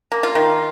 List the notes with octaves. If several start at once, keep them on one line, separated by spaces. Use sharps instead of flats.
A#3
F4
D#3